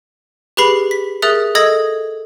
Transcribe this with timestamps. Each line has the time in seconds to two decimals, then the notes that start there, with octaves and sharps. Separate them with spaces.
0.57 G4 G#4 B4 B5 C7
0.91 B6
1.22 G#4 A#4 E5 D#6 F#6 A6
1.55 A4 D#5 D#6 E6 G#6 A#6